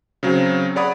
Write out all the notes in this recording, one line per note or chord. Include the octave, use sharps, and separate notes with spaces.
C#3 F#3 C4 C#4
G#4 C#5 D5 F#5 B5 D#6